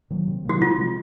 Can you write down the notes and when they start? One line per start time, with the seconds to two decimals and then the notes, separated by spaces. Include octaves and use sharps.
0.10 D#3 F#3 A#3
0.28 C3
0.45 D#3 F#3 A#3 F#4
0.61 C3 F4
0.78 F3 G#3 C4